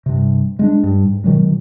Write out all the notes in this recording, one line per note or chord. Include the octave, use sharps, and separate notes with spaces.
G2 C3
G#3 A#3 D4
G2
G#2
B2 D#3 F#3 G#3